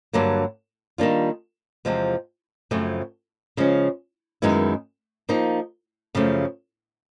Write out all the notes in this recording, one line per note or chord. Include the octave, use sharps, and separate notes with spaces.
G2 D3 F#3 A#3
D#3 G3 A#3 D4 F4
E2 C3 F3 G#3 C4
F#2 C#3 F3 A3 C4
C#3 F3 G#3 C#4
F#2 D#3 G#3 B3 E4
F3 A#3 D#4
F#2 C#3 F3 A3